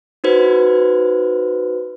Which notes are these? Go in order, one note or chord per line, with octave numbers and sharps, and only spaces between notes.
D#4 F#4 B4 C5